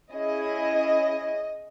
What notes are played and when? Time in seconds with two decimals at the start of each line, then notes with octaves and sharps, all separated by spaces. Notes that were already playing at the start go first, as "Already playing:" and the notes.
0.12 C#4 E4 G#4 D#5